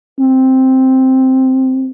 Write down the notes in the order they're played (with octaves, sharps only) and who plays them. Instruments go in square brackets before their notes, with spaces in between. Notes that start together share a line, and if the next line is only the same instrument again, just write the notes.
[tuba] C4